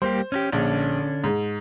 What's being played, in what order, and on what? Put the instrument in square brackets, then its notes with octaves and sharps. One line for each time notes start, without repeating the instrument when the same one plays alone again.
[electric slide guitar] G3 A#3 G4 [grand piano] C5
[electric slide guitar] C#4 D4 G4
[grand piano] A#1 [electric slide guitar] D3 C#4 D4
[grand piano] G#2